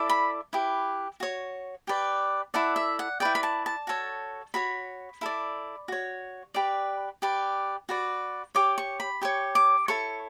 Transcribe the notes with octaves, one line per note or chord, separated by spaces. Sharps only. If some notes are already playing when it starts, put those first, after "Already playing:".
Already playing: E4 A4 D5
B5
E4 G4 B4
F#4 C#5
G4 B4 D5
E4 A4 D5 F#5
E5
F#5
E4 B4 D5 G5
B5
A5
A5
F#4 A4 C#5
F#4 C#5 B5
E4 A4 D5
F#4 C#5
G4 B4 D5
G4 B4 D5
F#4 B4 D5
G4 C#5 D6
C#6
B5
G4 C#5 C#6
D6
E4 A4 C#5 C#6